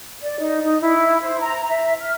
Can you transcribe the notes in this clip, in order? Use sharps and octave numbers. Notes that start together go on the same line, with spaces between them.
D5
D#4
D#4
E4
C5
A#5
E5
F6